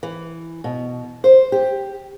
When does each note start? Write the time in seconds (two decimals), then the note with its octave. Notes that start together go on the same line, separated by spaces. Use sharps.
0.03 E3
0.64 B2
1.24 C5
1.52 G4